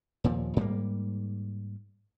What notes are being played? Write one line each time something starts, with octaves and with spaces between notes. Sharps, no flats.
D#2 A#2 F3
G#2 G3 G#3 A#3